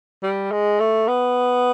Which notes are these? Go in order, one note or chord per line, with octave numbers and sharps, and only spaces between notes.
G3
G#3
A3
B3